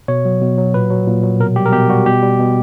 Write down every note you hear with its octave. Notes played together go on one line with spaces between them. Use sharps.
B2 C#5
F#3
B2
F#3
A#2 B4
F#3
A#2
F#3
B2 A#4
G3 G4
A#4
B2 G4
G3 F#4
B2 G4
G3
B2